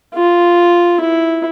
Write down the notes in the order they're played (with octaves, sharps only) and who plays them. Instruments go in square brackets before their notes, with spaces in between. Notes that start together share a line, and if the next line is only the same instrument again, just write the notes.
[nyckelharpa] F4
E4